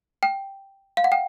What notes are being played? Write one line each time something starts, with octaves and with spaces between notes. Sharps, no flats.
G5
F5
F#5
G5